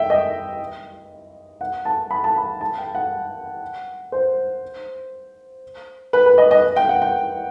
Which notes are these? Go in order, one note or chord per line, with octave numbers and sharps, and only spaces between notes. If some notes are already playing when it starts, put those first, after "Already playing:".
Already playing: E5 G5
D#5
F#5
A5
B5
A5
B5
A5
G5
F#5
C5
B4
B4
D#5
D#5
G5
F#5
G5